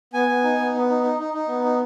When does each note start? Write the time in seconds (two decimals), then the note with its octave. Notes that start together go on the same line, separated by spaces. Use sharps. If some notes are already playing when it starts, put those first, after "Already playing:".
0.13 B3 G#5
0.28 B3
0.44 D#4
0.58 B3
0.74 B3
0.89 D#4
1.03 D#4
1.19 D#4
1.34 D#4
1.48 B3
1.64 D#4